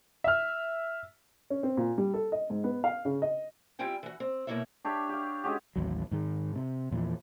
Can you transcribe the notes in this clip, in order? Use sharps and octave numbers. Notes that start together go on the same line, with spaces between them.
E5 F6
C#4
C4
A#2
G3
A4
D#5
G#2
B3
F5
C#3
D#5
G3 C4 E4 F4 G5 G#5
E3 F#4
C4
B2 A#3 D#4 E4 C#5 E5
D4 G4 C#5 E5
G4 F5
G#3 C#4 F#4 G4
A1 D#2 F#3
G#2 D#3 G#3
C3
E2 A#2 E3 F3